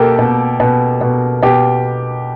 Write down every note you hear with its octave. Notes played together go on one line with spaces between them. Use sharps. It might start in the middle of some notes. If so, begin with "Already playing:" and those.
Already playing: B2 A#3 G4 A4
B2
B2
B2
B2 G4